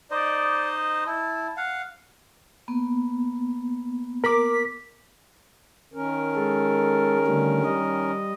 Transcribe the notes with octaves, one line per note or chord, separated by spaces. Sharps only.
D#4 C5 D5 D#5
E4 A5
F5 F#5
A#3 B3
A#4 D6 B6
D#3 C#4 A#4
G#3 A4
D3 G3 A3
G3 D#5